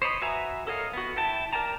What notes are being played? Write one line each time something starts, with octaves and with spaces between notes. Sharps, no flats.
C5 C#5 D#5 B5
F#4 B4 E5 G#5 A#5
A4 A#4 C#5 D#5 F5
B3 F#4
E4 G5 A5
A#4 D5 G5 A5 A#5